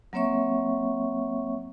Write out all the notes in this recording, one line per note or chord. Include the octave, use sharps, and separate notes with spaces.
F#3 A#3 C4 C#5 E5 C#6